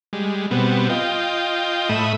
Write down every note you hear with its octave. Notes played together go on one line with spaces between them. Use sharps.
G3 G#3
B2 G3 B3 C4
F4 D#5 G5
A2 A3 E5 B5 D#6